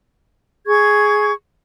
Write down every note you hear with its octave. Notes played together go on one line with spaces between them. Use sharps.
G#4 C#6 G#6